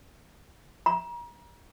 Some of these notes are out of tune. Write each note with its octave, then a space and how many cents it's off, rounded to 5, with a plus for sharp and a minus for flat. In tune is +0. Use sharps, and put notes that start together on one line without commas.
A#5 +30